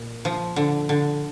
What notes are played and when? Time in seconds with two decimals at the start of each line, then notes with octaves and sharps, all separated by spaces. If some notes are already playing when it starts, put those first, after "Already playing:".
Already playing: A#2
0.25 F3
0.56 D3
0.89 D3